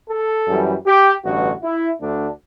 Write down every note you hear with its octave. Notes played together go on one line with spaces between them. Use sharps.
A4
F#2 E3 G3
G4
A1 G2 D3 F#4
E4
D2 D3 A3 D4